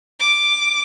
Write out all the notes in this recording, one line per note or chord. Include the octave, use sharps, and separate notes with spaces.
D6